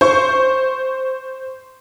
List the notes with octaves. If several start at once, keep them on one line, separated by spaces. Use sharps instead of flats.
C5 C#6